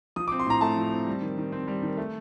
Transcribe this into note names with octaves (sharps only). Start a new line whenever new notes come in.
F3 D#6
D6
C4
C6
A2 A#5
A3 A5
F3
C4
G3
D#3
D#3
C4
G3
D#3
A3